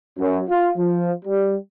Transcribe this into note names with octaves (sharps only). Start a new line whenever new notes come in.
F#2
F4
F3
G3